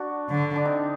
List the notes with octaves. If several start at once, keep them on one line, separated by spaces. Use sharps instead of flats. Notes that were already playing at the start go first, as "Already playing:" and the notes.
Already playing: D4 F#4
D3
D4
C4 D#4